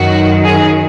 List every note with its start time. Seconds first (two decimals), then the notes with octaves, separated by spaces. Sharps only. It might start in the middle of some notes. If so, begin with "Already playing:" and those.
Already playing: F#2 D#3 F#3 F#4
0.44 G#4